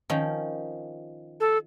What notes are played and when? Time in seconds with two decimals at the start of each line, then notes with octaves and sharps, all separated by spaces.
0.10 D#3 F3 C#4
1.40 A4